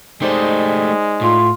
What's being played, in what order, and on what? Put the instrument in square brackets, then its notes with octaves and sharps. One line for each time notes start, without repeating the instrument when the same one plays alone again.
[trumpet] G#3 [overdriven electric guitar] A3 G4 [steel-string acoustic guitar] D#4 C5 D5
[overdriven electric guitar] A2 [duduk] F4